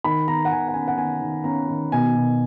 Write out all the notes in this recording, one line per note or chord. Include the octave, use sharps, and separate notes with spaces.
D#3 B5
D#3 A#5
F#5
D#3 G#5
F#5
C#4 G#5
F#5
D#3 G#5
D#3
C#4 A#5
D#3
B2 G#5
B2